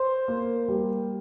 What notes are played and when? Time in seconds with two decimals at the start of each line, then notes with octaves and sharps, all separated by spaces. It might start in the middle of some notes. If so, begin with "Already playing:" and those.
Already playing: C5
0.28 A#3
0.68 G3